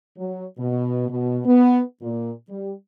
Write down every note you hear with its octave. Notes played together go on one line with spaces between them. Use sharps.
F#3
B2
B2
B3
A#2
G3